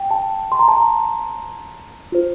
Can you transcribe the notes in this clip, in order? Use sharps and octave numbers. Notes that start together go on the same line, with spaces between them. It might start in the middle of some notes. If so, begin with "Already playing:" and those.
Already playing: G5
A5
C6
A#5
A5
A#5
F4 C5